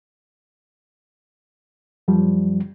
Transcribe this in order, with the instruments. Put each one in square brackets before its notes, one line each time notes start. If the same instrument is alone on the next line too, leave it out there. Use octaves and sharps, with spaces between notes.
[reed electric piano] F#2 F3 G3